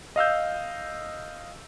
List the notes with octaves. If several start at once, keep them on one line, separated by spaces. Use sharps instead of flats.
D#5 F5 E6 G6